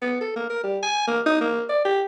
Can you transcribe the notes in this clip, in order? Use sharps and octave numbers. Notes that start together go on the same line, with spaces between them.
B3
A4
A#3
A#4
G3
G#5
A#3
D#4
A#3
D5
G4